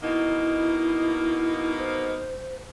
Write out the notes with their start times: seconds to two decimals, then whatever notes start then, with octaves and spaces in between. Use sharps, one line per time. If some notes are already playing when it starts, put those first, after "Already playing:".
0.03 B2 A#3 D#4 E4
1.79 C5